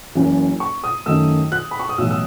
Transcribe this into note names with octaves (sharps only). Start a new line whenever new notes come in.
F#1 F#2 E3
C#6
D#6
F#2 D#3 A3 E6
F#6
B5
C#6
D#6
B1 A2 E3 E6
E6